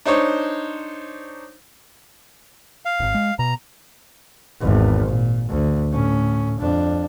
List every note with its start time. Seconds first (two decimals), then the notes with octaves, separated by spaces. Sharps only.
0.05 D4 D#4 C5 C#5
2.85 F5
3.00 D1 G#1
3.14 G#3
3.39 B2 A#5
4.60 G#1 E2
5.06 A#2
5.48 D2
5.91 A2 C#4
6.59 F2 D4